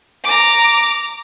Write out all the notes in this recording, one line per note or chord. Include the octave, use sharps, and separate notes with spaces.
A#5 D6